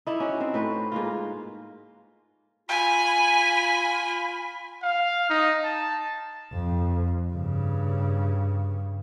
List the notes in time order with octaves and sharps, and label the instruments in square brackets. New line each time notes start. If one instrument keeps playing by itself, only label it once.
[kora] D#4 E4 D5
C#4 F#4
C4
A2 B4
G#2 A#3 F4
[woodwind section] F4 B5 [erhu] G#5
[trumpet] F5
D#4
A5
[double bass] F2
G2 C#3